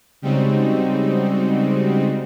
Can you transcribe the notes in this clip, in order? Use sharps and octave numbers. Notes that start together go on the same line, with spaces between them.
C#3 G3 G#3 C4 D#4 F#4